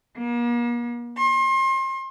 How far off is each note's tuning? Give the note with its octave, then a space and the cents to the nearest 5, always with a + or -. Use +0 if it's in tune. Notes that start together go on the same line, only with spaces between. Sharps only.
A#3 +40
C6 +35